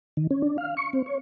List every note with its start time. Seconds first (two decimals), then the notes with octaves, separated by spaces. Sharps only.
0.17 D#3
0.31 C#4
0.42 D4
0.58 F5
0.77 C#6
0.93 C4
1.06 C#5